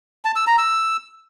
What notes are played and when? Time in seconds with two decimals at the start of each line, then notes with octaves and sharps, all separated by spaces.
0.25 A5
0.36 E6
0.47 A#5
0.58 E6